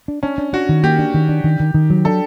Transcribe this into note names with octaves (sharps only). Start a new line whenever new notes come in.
D4
C#4 D4
D4
D4 F#4
D#3
A#3 G4
D4
D#3
D4
D#3
D#3
D#3
F#3
D4 A4